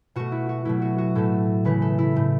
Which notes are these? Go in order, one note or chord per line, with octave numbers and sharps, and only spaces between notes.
B2 A3 F#4
E4
F#4
B2 F#3 A3 E4
F#4
F#4
A2 A3 A4
C#3 E3 A3 B4
A4
E4
A2 A3